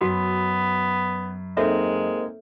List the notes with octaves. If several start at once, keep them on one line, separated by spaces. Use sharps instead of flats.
F#2 B3 F#4 B5
G#3 A#3 C4 D#4 A4 C#5 E5